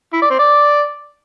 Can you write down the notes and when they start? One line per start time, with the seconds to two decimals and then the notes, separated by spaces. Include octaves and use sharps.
0.13 E4
0.22 D5
0.30 C4
0.39 D5